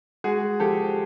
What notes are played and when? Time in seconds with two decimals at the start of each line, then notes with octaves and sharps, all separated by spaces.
0.24 G#3 F#4 G#4
0.60 F3 G4 A4